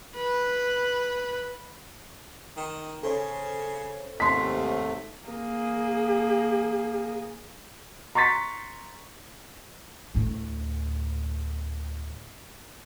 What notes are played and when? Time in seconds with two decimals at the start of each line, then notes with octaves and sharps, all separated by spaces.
0.17 B4
2.57 D#3
3.03 C#3 A4 C5 C#5
4.20 D#2 G#2 C3 A3 C6 B6
5.27 A#3 G#4
8.15 A#5 C6 C#6 A6 B6
10.15 D2 A2